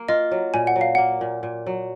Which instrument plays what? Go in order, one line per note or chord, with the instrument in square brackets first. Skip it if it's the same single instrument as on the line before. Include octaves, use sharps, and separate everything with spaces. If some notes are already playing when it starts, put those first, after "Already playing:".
Already playing: [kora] A#3
[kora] F4 [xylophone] D#5
[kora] F#3
[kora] A#2 [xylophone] G#5
[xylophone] F#5
[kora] F#3
[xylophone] F5
[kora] A#3 [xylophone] F#5
[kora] A#2
A#2
F#3